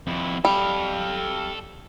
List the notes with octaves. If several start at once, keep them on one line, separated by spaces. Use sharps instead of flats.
F2 E4
G3 A4 F5